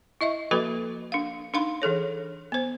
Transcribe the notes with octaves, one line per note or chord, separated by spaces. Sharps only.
E4 D#5 E5 C#6
F3 A#3 F#4 A4 B4 B5
D4 F5
D4 D#4 F5 B5 C6
E3 G#4 A4 C#5
B3 C5